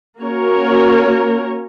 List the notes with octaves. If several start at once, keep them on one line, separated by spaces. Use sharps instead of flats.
A#3 C#4 F#4 A#4 C#5